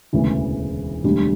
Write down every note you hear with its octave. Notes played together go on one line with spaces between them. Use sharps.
E1 D2 C#3 E3
E1 D2 D3 G3